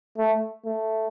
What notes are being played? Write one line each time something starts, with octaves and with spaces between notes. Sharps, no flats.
A3
A3